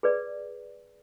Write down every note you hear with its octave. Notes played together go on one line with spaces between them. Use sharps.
G#4 B4 D5